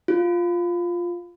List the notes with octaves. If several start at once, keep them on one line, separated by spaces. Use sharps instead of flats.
F4